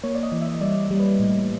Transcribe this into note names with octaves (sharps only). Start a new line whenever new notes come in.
A#3 C#5
D5
D#5
E3
E5
G3 D5
G3
B4
A2